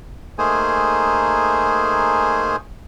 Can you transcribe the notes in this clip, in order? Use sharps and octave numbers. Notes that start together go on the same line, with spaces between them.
A3 A#3 D#4 G#4 C5 G#5